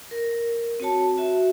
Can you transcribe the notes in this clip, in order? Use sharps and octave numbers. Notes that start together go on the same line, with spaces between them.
A#4
C4 F#4 C#5 A5
F#4 E5